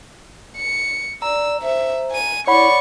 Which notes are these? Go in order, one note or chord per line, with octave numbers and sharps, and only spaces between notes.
C#7
D5 A#5 E6
C5 E5
G#5 D#7
E4 C#5 D5 F#5 B5 C#6